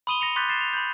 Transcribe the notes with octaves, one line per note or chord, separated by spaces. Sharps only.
B5 C6 D#6 D#7 F7 G7
A#6 C#7 F7
C6 D6 F#6 G6 A6 B6
A6 C7 E7 G7
F7
B5 G6